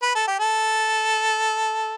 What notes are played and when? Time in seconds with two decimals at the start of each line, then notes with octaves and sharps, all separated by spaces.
0.03 B4
0.15 A4
0.28 G4
0.40 A4